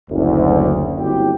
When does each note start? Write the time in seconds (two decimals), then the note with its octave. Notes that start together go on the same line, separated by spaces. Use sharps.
0.10 F#1 D2
0.99 G1 C4 E4 F#4 G4 G5